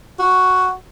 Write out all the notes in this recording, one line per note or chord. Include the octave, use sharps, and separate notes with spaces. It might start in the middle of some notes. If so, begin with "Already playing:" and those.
F#4